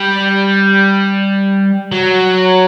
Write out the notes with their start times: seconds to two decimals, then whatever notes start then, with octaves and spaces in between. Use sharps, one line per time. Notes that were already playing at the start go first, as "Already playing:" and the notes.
Already playing: G3
1.92 F#3